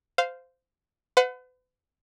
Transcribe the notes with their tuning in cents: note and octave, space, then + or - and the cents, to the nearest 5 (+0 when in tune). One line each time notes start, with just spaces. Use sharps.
C5 -15 F5 +0
B4 +40 F#5 -20